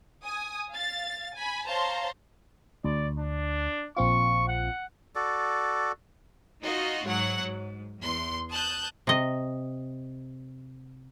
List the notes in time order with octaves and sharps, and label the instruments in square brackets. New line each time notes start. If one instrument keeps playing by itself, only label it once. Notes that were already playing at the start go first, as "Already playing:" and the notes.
[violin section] G#5 D#6
F5 A6
G#5 B5
C5 C#5 F5 A5 A#5 C6
[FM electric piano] D2 [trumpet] D5
[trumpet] D4
[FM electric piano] A#1 C4 F4 [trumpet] C#6
[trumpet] F#5
[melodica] F#4 A4 D5
[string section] D#4 F4 F#4 D#5
G#2 F#3 C#5 F#5
G#2
E2 C6
A5 D#6 F#6 G6
[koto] C3 D#5